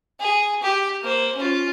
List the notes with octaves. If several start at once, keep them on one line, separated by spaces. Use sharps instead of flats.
G#4
G4
A#3 C5
C#4 F4